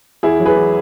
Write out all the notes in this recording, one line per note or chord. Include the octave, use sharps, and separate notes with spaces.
E2 E4 G#4
F#3
G#4 B4
E2